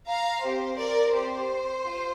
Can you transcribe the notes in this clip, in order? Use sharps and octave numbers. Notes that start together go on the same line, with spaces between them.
F5 A#5
C4 G4 C5
A#4 D5
C4 G4 C5
F4